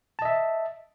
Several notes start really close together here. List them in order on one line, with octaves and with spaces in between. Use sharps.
A5 D#5 E5